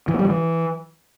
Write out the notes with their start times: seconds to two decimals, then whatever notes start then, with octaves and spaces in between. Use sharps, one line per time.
0.08 E3
0.14 A#3
0.19 G3
0.25 F3
0.30 E3